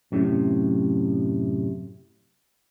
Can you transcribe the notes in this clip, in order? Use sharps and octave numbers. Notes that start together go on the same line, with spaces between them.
F#2 A2 C3